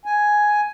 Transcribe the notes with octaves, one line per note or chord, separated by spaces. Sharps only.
G#5